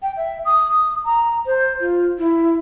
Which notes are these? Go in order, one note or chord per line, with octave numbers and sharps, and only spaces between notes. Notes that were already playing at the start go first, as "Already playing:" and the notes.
G5
E5
D#6
A#5
C5
F4
E4